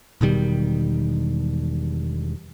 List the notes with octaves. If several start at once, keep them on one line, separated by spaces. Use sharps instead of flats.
E1 B2 D#3 G3